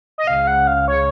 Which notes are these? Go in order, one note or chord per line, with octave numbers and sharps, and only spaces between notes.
D#5
C#2 C#3 F5
F#5
F5
C#5